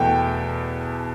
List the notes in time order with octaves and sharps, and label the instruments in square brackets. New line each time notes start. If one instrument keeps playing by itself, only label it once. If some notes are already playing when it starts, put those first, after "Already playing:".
Already playing: [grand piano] E2 B2 A3 G5